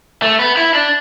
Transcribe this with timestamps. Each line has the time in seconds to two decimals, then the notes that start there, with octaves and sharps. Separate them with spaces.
0.22 A3
0.39 B3
0.57 E4
0.75 D4